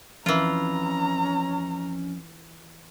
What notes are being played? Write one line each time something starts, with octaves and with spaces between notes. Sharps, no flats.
F2 E3 C#4 F4 A#5